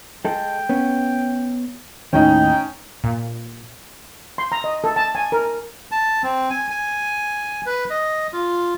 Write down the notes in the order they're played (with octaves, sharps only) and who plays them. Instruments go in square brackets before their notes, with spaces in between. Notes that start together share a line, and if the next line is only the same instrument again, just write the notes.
[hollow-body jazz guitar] G#3 A4 [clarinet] G5
[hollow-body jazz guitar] B3 C#4
[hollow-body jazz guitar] D#2 A2 [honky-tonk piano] C#4 D#4 [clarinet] G5
[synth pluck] A#2
[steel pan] C6
A#5
D#5
A4
A5
G#5
A#4
[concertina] A5
C4
G#5
G#5
B4
D#5
F4